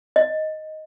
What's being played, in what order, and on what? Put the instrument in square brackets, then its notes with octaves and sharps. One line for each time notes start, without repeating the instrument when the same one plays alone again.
[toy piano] D#5